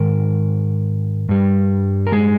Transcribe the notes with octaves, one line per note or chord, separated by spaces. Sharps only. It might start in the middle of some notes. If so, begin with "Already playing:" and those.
Already playing: G#2 D#3 A#4
G2 G3
A#4
G#3 G#4